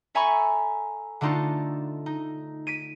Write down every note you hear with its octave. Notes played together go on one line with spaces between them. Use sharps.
A4 E5 G#5 A#5 B5 C#6
D3 A3 D4 D#4 F4 A4
D#4
B6 D7 D#7